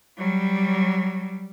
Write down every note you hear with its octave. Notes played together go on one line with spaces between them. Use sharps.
F#3 G3